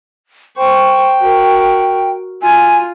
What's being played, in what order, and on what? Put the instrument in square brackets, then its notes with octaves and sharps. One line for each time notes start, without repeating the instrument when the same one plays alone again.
[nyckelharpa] C5 C#6 [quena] G5
[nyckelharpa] F#4 A#4
[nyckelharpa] F4 [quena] G#5